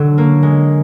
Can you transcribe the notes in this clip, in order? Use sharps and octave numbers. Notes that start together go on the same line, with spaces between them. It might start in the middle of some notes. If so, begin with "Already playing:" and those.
Already playing: D3 F#3
A#3
G#3